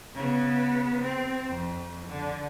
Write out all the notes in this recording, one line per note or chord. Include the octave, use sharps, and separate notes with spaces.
C#3 B3
C4
F2
D3